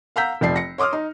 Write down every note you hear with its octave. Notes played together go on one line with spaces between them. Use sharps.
F5 F#5 A#5 E6 G6 B6
F1 F3 D5 C7
A#6 C#7
C#5 C6 D6 D#6 F6
D#4